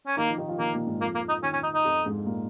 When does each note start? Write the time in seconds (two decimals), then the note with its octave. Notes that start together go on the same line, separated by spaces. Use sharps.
0.07 C#4
0.17 D#3 A#3 D#4
0.28 F3 F4
0.38 D#3 D#4
0.49 F3 F4
0.59 D#3 A#3 D#4
0.74 A#2 A#3
0.87 G#2 G#3
1.01 F2 F3 A#3
1.15 A#3
1.29 D#4
1.43 D#3 C#4
1.53 C#4
1.63 D#4
1.74 D#4
1.85 F2 F3
2.06 G#2 G#3
2.26 A#2 A#3